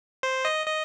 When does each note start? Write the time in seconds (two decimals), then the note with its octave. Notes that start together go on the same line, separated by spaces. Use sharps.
0.23 C5
0.45 D#5
0.66 D#5